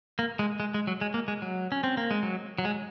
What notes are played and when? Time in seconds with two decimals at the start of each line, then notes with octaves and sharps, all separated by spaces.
0.19 A#3
0.39 G#3
0.60 G#3
0.74 G#3
0.87 F#3
1.01 G#3
1.14 A#3
1.28 G#3
1.42 F#3
1.72 C#4
1.84 C4
1.97 A#3
2.11 G#3
2.23 F#3
2.58 F#3
2.65 G#3